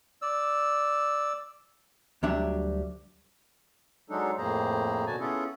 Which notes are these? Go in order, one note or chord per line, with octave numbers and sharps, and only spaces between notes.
D5 E6
D2 F#3 G3 D4 E5
F#3 G#3 D4 D#4 A4
F2 A2 A#3 G#4 C5 A#5
B2 D3 F#4 G#5 A5
B3 C#4 E4 F4 G#4 A4